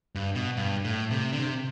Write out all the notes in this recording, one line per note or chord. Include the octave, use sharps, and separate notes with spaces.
G2
B2
G2
A2
C3
D3
C3